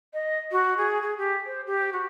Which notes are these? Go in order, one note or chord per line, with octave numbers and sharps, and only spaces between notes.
D#5
F#4
G#4
G#4
G4
C5
G4
F#4